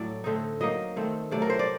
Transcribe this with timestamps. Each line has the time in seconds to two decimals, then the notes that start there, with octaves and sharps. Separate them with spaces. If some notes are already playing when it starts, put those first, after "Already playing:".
Already playing: A2 F#3 A3 D5
0.24 D3 A3 C4 D#4
0.61 F#3 A#3 D#4 D#5
0.96 D#3 A3 C4
1.31 C3 F#3 A3 D5
1.42 A#4
1.50 C5
1.59 D5